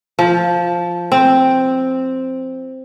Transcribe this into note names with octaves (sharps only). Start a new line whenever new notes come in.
F3
C4